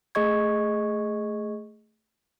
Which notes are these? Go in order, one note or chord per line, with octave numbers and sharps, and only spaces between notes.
A3 G#4 D#5 C#6 G#6